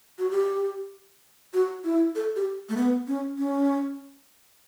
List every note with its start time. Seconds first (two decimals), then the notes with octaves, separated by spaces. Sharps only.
0.19 F#4
0.31 G4
1.54 F#4
1.84 E4
2.16 A4
2.36 G4
2.69 A3
2.77 B3
3.07 C#4
3.38 C#4